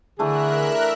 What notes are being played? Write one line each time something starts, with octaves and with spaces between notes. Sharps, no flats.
D3 E3 A3 D4 G#4 A#4 E5 F#6